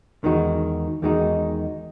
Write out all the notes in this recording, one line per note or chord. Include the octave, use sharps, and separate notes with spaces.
E2 D#3 G#3 D#4 F#4
E2 D#3 G#3 D#4 F#4